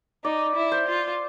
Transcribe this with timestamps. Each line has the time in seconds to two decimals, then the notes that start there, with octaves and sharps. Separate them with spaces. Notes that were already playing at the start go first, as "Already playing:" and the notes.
0.24 D#4 D5
0.56 E4
0.72 C5
0.88 F4